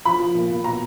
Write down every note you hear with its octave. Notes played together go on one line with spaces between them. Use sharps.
F3 B5
F3
A#2
A#2
B2 A#5